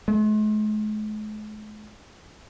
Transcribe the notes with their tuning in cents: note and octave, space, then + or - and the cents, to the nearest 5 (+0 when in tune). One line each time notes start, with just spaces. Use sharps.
G#3 +45